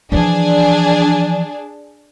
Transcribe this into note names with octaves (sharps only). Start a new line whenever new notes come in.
E3 F3 D4 G#4